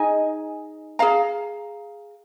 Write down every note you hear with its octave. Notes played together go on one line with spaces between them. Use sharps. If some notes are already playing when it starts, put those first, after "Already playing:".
Already playing: D#4 G#4 D#5 G#5
G#4 F5 A#5